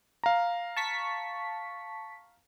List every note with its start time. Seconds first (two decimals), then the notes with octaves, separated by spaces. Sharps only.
0.24 F5 A#5
0.76 A5 C#6 B6